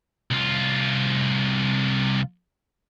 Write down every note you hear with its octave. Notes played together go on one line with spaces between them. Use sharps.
C2 F4